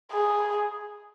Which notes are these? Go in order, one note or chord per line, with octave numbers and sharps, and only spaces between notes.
G#4